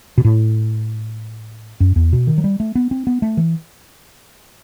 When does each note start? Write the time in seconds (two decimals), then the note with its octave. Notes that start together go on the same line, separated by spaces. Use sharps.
0.18 B2
0.25 A2
1.80 F#2
1.96 E2
2.13 B2
2.27 D#3
2.38 F#3
2.44 G3
2.60 A3
2.75 B3
2.91 C4
3.07 B3
3.22 A3
3.37 E3